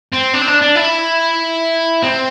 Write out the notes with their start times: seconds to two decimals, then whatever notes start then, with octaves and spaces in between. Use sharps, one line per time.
0.12 C4
0.34 D4
0.42 C4
0.47 D4
0.62 D4
0.76 E4
2.02 C4